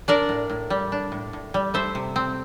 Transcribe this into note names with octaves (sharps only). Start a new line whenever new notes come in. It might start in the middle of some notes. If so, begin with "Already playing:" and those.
D4 A#4 D5
A2
A2
G3
D4
A2
A2
G3
A3 C5 E5
C3
C4